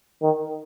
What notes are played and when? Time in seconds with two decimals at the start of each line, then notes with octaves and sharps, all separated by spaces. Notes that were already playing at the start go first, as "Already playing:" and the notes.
0.22 D#3